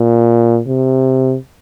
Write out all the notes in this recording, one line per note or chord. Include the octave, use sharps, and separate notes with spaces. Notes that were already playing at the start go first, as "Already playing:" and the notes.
Already playing: A#2
C3